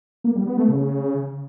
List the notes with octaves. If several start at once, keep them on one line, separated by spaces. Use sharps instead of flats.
A#3
G3
B3
A3
C#3